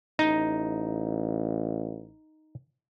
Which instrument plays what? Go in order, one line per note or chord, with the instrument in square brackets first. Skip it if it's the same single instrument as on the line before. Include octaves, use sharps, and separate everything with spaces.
[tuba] A1 [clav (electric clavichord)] D#4